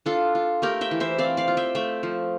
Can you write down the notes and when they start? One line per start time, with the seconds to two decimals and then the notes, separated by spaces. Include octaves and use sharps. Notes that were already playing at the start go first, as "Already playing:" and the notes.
0.06 D4 F4 A4
0.35 F4
0.62 A3 G4 A#4
0.81 E5 G5
0.91 E3
1.00 C5 E5
1.18 C4 D5 F5
1.37 D5 F5
1.48 F4
1.57 E5 G5
1.75 A3 E5 G5
2.03 F3